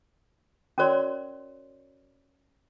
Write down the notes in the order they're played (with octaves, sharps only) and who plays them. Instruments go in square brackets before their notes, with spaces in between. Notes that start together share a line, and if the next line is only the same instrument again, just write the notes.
[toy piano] C#4 F#4 A#4 C#5 D5 C6